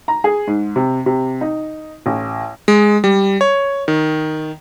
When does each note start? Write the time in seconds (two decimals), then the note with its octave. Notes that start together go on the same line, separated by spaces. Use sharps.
0.08 A#5
0.24 G#4
0.47 G#2
0.76 C3
1.06 C3
1.41 D#4
2.06 A1
2.68 G#3
3.04 G3
3.41 C#5
3.88 D#3